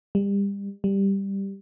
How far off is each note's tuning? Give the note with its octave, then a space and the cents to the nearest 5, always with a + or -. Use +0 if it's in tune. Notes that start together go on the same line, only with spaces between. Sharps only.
G3 +30
G3 +5